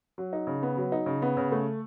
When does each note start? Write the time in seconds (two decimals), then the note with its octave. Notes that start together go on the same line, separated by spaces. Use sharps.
0.18 F#3
0.33 D#4
0.47 C#3
0.63 B3
0.77 F#3
0.92 D#4
1.06 C#3
1.22 B3
1.37 C#3
1.52 A3